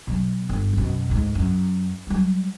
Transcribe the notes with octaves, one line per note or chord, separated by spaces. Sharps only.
B2 F#3
G1
F#2 B2
D2 G#2
F#2
F#3 G3